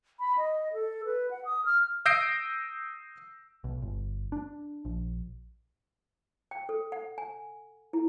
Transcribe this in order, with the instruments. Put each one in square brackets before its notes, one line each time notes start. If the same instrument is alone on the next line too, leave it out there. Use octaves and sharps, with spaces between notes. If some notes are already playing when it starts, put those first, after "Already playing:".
[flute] B5
D#5
A4
B4
F#5
D#6
F6
[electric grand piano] D#6 E6 G6 A#6 C7 D7
[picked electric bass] B1
G1
D4
A#1
[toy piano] G5
A4
F#5
G#5
E4